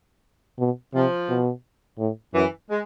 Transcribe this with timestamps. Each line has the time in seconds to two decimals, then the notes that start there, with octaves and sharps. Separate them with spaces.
0.59 B2
0.94 C3 F3
1.29 B2
1.99 A2
2.34 F#2 E3
2.69 G#3